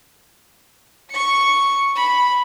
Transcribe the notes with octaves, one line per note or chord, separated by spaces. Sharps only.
C#6 C#7
B5